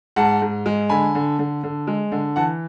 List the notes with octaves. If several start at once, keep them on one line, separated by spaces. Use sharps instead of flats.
G#2 F#5 A5
G#2
G#3
D3 G#5 B5
D3
D3
D3
G#3
D3
E3 F#5 A5